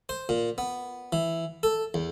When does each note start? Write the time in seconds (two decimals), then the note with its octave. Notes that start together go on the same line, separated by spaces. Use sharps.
0.09 C5
0.29 A#2
0.58 B3
1.13 E3
1.63 A4
1.94 E2